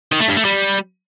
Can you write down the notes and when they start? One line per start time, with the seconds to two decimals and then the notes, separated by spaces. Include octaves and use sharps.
0.12 D#3
0.20 A3
0.28 G2
0.36 A3
0.45 G3